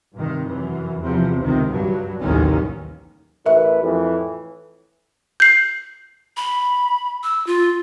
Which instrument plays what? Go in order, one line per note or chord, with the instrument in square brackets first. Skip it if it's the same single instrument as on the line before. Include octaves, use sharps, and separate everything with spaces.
[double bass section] G2 C3 D#3
F#2 E3
E2 C3 F3
C#2 C3 D#3
G2 F#3
A1 D#2 C3 D#3 F#3 C#4
[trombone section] A1 E4 B4 [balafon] A#4 E5
[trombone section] F2 A2 E3
[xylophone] G6 C7
[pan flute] B5
E6
F4